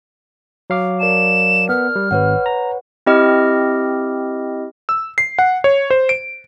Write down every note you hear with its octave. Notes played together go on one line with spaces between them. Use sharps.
F#3 F5 D6
A#4 D5 A5 E7
B3 F6
G3
G#1 B4 C#5 F#5
A#5
C4 E4 G4 D#5 F6
E6
C7
F#5
C#5
C5
D7